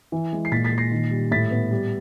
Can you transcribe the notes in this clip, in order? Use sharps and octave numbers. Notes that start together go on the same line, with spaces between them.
E3
G#3
C7
A#2 A6 B6
A6 B6
A#2
A#6 C7
D#3
G3
A2 A6 B6
B3
G3